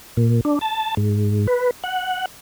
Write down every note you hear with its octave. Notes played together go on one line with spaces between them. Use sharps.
A#2
D4
A5
G#2
B4
F#5